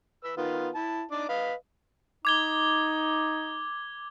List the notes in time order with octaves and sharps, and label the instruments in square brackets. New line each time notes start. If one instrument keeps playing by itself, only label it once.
[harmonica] B4 E6
D#3 B3 F4
E4 A5
D4 D#4 D6
B4 D#5 F5
[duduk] D#4 [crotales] D6 G#6 G7